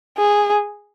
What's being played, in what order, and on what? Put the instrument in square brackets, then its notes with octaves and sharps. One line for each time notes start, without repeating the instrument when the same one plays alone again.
[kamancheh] G#4